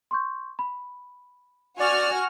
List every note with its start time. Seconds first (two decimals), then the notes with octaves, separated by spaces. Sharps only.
0.11 C6 C#6 G6
0.59 B5
1.80 F#4 D5 G#5 F6